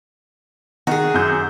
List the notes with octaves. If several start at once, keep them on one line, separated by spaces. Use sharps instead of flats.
D#3 F#4 G#4
F#2 G6